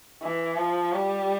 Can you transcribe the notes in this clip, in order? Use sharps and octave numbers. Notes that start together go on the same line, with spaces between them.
E3
F3
G3